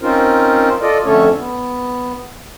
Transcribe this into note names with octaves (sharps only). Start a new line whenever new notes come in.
C4 C#4 D#4 F4 A#4 C5
F4 A4 D5 D#5
F2 D3 A3 C#4 A4 C#5
B3